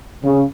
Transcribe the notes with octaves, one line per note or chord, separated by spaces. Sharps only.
C#3